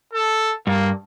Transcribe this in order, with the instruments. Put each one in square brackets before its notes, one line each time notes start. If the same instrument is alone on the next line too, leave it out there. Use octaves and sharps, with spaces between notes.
[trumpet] A4
[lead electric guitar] G2 [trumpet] A#3